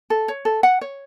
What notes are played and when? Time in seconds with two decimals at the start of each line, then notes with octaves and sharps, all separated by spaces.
0.10 A4
0.28 C#5
0.45 A4
0.63 F#5
0.81 C#5